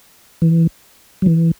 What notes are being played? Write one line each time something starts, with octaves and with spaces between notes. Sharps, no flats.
E3
F#3
E3